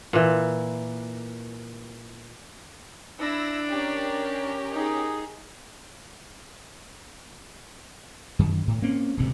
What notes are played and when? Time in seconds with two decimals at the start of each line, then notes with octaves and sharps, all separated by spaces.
0.13 A#2 E3
3.20 D4 E4 E6 A#6
3.69 C#4 G4 A#4
4.72 D#4 G#4
8.39 F#2 D#3
8.67 A2
8.82 A#3 C4 C#4
9.17 D#1 D2 G2 C3